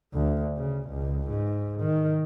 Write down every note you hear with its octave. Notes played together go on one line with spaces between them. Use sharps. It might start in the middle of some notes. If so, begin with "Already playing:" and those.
D2
C#3
C#2
G#2
D#3